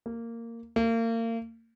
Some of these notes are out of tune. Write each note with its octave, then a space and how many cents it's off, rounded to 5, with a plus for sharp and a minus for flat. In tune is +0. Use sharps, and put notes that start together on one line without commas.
A#3 -15
A#3 -35